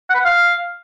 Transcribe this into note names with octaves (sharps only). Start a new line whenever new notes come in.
F#5
B4
F#5
F5